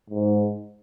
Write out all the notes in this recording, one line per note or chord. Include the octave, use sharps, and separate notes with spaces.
G#2